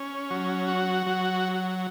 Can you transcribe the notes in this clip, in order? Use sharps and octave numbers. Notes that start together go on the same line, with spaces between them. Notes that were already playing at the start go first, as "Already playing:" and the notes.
Already playing: C#4
F#3
F#4
F#3